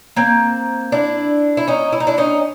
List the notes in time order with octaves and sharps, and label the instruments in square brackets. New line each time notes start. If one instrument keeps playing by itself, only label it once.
[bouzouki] A#3 C4
D4 E4
E4
C#4 D#4
E4
D#4
D4 E4
C#4 D#4